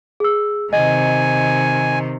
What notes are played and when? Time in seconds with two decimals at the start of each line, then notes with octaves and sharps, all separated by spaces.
0.20 G#4 E6
0.73 C3 D#3 D#5 G#5